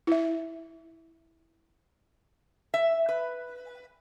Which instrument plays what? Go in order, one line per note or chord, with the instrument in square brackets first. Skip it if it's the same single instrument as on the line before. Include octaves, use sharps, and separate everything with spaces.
[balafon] E4 E5
[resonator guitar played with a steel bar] E5
B4